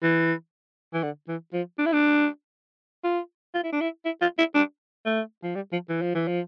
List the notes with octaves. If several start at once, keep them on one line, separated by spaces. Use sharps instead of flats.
E3
E3
D3
E3
F3
D4
E4
D4
F4
F4
E4
D4
E4
E4
F4
E4
D4
A3
F3
G3
F3
E3
F3
E3
F3